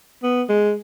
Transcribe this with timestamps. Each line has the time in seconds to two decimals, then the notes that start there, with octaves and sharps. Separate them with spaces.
0.23 B3
0.49 G#3